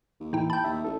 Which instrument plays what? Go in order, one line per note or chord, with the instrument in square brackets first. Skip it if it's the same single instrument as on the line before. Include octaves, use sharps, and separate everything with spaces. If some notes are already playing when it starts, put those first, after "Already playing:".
[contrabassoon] D#2
[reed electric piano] A2 E3 [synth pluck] D#4 E4 G5
[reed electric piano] G5 A5 [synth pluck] B5 G6
[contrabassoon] D#2 [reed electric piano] E5
[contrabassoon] A1 [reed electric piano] A4